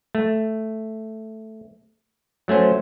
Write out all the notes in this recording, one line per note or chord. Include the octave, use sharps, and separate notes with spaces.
A3
F#3 A3 C#4 C5